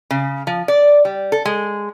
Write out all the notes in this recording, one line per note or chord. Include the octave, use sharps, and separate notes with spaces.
C#3
F3
D5
G3
A4
G#3